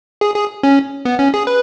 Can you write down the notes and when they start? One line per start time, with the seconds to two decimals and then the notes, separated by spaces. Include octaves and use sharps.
0.21 G#4
0.35 G#4
0.63 C#4
1.05 B3
1.19 C#4
1.34 G#4
1.47 B4